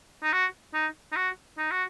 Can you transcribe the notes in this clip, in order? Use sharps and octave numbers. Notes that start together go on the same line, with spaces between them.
D#4
F#4
D#4
D#4
F#4
D#4
F#4